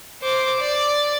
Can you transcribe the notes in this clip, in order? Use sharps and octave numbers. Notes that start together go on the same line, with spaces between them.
C5 D6
D5